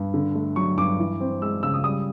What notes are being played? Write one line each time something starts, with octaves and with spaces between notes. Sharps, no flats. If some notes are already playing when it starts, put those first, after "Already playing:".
Already playing: G2
D3
A3
F#3 C#6
G2 D6
E3
C4
G#3 E6
C#3 E6
D#6
G3 D#6